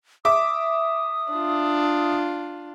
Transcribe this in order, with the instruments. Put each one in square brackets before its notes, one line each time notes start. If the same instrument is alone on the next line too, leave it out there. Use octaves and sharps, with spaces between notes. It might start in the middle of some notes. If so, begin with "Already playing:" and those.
[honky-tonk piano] E5 D6 [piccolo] D#6
[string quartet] D4 F4